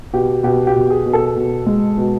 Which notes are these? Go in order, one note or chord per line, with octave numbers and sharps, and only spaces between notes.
B2 G4
B2 G4
G4
B2
G#4
B2
A4
B2
G#3
B2